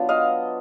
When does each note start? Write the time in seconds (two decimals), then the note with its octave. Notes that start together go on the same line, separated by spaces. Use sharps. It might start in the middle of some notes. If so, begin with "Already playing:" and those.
Already playing: F#3 B3 D4 F4
0.09 D#5 F5